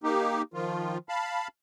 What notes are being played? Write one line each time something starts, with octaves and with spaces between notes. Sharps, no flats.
A#3 D#4 G4
D#3 F3 F4
F5 A5 B5